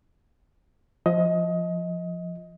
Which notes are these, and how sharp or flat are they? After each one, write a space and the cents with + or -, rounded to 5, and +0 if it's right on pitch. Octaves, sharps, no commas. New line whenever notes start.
F3 +0 D#5 +20